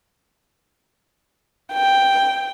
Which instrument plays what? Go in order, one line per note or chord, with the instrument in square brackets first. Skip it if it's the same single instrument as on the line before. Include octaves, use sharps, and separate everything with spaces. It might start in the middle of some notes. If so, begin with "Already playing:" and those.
[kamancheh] G5